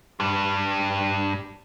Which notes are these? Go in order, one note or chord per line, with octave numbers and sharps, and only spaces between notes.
G2 G3